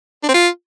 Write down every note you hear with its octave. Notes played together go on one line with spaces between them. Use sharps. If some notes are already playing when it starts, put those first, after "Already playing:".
D4
C4
F4